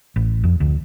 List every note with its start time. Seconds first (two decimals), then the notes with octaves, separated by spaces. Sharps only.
0.16 A1
0.43 F2
0.60 D2